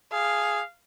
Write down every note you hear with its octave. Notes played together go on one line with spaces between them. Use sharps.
G#4 F5